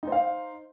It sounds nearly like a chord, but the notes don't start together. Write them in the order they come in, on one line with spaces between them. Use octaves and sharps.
D#4 C5 F5